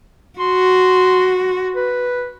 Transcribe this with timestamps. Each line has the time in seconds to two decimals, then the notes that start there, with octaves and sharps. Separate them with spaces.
0.40 F#4 C6
1.76 B4